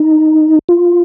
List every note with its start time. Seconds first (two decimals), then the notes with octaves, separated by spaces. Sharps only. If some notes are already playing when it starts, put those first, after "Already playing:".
Already playing: D#4
0.69 F4